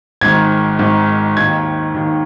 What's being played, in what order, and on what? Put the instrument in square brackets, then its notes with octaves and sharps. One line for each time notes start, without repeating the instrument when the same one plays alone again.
[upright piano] G#1 G#2 D#3 G#6
G#1 G#2 D#3
D#2 D#3 G#6
D#2 D#3